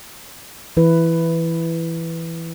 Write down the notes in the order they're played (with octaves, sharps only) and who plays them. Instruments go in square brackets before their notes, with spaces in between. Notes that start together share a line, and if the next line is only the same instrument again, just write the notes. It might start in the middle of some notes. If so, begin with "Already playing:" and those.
[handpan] E3 E4 B4